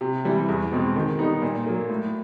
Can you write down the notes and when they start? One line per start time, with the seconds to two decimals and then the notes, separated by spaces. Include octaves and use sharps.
0.01 C3
0.25 E3 G3
0.49 E2
0.72 B2 G#3 C4
0.96 D#3
1.19 G3 B3 D#4
1.42 A#2
1.66 F#3 A#3
1.90 A2